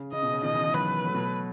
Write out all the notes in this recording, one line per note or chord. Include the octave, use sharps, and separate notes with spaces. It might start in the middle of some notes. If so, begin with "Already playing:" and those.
Already playing: C#3
C#3 D#5
B2
C#3
B2 D#3 D#5
C#3 E3
C#3 E3
D#3 F#3 B4
F#3 A3
B2